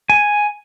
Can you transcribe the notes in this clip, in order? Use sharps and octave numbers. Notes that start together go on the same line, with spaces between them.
G#5